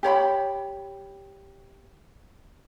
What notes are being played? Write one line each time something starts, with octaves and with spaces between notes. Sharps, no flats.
G4 C#5 A#5 B5